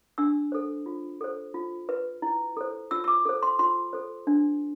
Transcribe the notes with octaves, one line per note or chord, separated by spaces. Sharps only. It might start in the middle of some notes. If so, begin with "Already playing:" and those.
D4 E6
A4 C5
F4
A4 C5
F4
B4
E4
A4 C5
F4 E6
E6
D6
A4 C5
C6
F4 C6
A4 C5
D4